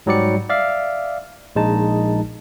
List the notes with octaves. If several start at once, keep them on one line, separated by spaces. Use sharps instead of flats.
G#2 F#3 G3 G4 D5 C#7
D5 E5 F5
A#1 G#3 D#4 A5